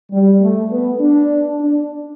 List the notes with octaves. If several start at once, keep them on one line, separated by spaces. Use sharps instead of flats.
G3
A3
B3
D4
D4